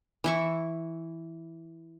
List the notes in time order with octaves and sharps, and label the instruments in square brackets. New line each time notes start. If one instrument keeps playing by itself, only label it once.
[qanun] E3 E4 C#6